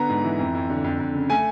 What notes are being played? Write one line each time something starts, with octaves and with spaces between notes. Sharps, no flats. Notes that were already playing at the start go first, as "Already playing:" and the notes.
Already playing: D3 B3 A#5
G#2
E3
F2
F2
D3
F2
F2
C#3
A3 G#5